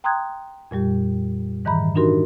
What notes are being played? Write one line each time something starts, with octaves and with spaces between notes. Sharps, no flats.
G5 A#5 C6 D#6 F#6 G#6
F2 A#2 G3 G4
G#2 D#3 E3 A#5 B5
D4 D#4 F#4 G4 A#4 C6